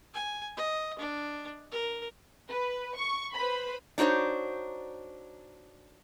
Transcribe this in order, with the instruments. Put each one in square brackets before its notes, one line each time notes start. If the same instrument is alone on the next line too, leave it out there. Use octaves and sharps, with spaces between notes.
[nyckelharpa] G#5
D#5
D4
A#4
[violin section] B4
C#6
B4 C5 B5
[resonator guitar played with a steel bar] D4 D#4 F#4 C5 C#5